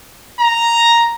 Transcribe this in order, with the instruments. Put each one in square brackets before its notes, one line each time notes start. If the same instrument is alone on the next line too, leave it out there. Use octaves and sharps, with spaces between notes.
[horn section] A#5